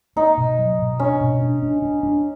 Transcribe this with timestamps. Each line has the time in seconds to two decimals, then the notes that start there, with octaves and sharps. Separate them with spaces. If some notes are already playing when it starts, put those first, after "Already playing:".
0.16 A#3 D#4
0.37 B2
0.59 F#3
0.79 B2
1.00 C#4 D4
1.21 B2
1.42 D4
1.62 D4
1.82 D4
2.03 D4